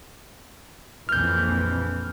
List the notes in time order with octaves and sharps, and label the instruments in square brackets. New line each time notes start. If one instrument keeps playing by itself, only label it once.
[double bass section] A#1 F2 E3 [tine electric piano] F6 G6